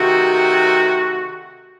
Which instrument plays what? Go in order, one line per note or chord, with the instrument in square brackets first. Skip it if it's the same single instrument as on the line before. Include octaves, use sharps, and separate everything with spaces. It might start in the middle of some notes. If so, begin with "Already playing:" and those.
Already playing: [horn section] C3 D#3 A3 F#4